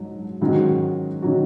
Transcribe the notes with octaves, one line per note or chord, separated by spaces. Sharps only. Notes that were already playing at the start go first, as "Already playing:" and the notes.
Already playing: G#2 F#3 D#4
G#2 D#3 F#3 C#4 F#4
D#3 F#3 C#4 F#4